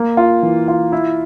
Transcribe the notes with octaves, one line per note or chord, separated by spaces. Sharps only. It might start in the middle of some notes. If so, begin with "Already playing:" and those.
Already playing: A#3
F4
E3
F4
E4